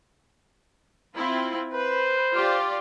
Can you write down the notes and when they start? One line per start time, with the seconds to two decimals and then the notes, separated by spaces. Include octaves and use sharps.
1.15 C4 E4 F4
1.72 B4 C5
2.33 F4 G4 D5